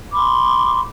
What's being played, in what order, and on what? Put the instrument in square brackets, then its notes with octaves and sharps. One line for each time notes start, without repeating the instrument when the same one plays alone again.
[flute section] B5 C6 D6